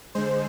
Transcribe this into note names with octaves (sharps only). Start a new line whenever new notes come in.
D3 G#3 C5